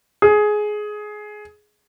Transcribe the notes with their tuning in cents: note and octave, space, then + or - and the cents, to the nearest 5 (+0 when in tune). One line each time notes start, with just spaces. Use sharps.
G#4 +15